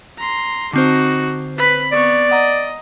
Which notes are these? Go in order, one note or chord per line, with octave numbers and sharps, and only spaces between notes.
A#5 C6
D3 C4 D#4 F#4 C5
B4 B5
B3 D5 C#6
D#5 F#5 A#5